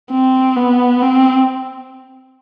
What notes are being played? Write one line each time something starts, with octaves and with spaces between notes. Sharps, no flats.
C4
B3
C4